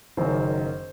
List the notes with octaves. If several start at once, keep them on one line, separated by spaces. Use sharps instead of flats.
F#1 F#2 D#3 C5